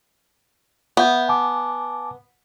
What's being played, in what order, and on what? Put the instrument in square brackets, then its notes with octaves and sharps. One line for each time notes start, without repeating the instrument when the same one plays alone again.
[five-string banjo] B3 [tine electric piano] E5 G6
[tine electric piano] G#5 A5 D6